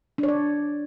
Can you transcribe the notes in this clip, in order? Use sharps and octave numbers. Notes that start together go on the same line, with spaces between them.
D4
C#5
D5